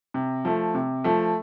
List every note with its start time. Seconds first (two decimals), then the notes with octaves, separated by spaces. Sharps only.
0.14 C3
0.45 F3 A3
0.75 C3
1.04 F3 A3